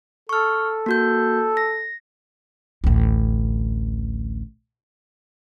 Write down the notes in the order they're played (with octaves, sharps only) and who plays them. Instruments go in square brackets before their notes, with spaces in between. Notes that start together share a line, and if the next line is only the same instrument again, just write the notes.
[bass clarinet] A4 [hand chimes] C#6 F6
[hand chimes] A#3 F#4 G6
A#6
[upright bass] A1 D2